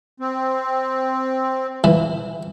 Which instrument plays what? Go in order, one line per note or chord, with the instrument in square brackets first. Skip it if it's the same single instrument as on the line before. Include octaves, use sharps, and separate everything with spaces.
[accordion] C4
[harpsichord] E3